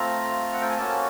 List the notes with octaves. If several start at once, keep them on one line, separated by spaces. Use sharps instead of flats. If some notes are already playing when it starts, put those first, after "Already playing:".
Already playing: A3 C4 F4 A#5
F#5
G5
G#5
A#3 C#4 F#4 A5